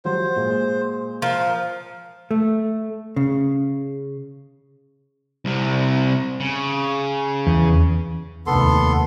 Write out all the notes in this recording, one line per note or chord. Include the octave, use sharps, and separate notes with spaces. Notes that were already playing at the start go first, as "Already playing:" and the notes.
F3 F#3 G4 C5
A#2 G#3
F3 A#4
A3
C#3
C2 C3
C#3
E2
F1 D#2 B3 A4 C6